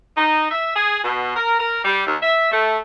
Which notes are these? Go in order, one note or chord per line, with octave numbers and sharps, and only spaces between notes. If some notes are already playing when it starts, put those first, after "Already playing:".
D#4
E5
G#4
B2
A#4
A#4
G3
D#2
E5
A3